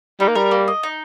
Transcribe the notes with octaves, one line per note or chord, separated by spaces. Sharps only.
G3 D#4
A#3
G3 A#4
A#3
D#5
D#4